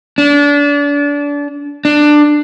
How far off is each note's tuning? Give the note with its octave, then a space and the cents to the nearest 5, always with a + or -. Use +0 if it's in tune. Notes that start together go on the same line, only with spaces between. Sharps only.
D4 -30
D4 +15